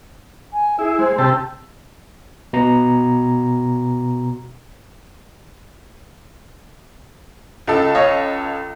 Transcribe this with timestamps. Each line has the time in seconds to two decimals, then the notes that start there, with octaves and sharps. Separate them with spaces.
0.53 G#5
0.79 E4 G#4
0.99 G#3 C5
1.18 C3 G4 A5 E6
2.53 B2 A#5
7.67 C#2 A4
7.95 C#5 D#5 F5